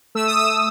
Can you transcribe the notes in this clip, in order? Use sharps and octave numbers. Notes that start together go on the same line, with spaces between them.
A3 E6
D#6
E6